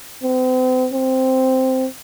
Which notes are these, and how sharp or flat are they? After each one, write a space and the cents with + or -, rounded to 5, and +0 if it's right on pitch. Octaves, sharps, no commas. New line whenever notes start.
C4 -40
C4 -5